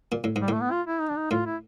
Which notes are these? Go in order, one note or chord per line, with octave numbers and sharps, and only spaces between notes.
A#2
A2
G#2
G3
A2 A3
B3
F4
E4
D#4
D4
D#4
A2 F4
E4